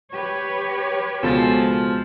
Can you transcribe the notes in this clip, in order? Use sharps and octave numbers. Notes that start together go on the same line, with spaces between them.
G4 B4 C#5
C#2 B2 F3 G#3 A4